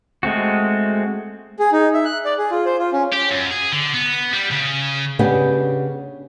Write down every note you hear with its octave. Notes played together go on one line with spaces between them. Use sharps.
G#3 A3 C4 F#4
G#4
D#4
E5
F#6
D5
G#4
F4
C5
F4
C#4
G4
F#2
G#4
D3
B3
G3
C#3
C#3 B3 D4 G4